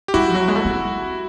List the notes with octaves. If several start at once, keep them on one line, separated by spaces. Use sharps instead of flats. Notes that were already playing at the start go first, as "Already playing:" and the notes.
G4
G3 E4 F#4
F3
F#3
G#3
A3
C4